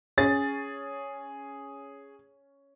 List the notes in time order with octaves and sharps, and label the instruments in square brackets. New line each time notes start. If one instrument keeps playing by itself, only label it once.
[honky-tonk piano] C#4 A6 [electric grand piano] G#4